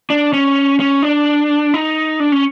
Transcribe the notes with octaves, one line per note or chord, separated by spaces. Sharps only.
D4
C#4
C#4
D4
D#4
D4
C#4